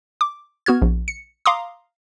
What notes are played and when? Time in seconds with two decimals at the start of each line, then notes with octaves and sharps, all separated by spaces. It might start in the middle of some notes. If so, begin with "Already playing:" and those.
0.21 D6
0.66 B3 F#4 F6 G#6
0.82 A#1
1.08 C#7
1.46 F5 A#5 C6 D6 D#6